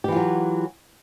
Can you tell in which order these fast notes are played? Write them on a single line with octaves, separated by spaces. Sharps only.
G4 E3 F4 F#3